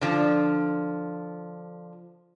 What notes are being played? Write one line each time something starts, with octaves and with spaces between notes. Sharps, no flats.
D3 F3